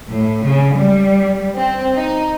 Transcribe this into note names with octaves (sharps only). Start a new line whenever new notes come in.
A2
C#3
G3
C4
D#4